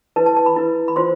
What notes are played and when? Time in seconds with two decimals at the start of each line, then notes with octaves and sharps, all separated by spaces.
0.16 E4 B4 A5
0.26 A5
0.36 A5
0.46 B5
0.56 E4 B4
0.88 B5
0.96 F4 C5 C6